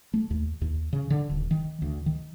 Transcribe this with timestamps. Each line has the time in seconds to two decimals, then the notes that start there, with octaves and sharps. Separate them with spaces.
0.14 A3
0.30 D#2
0.61 D#2
0.93 C#3
1.10 D3
1.30 D#1
1.51 D#3
1.82 D2
2.06 D#3